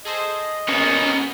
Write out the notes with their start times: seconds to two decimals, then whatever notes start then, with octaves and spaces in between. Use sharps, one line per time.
0.05 G#4 A4 C5 D#5
0.68 A#1 B2 A#3 B3 C#4 D#4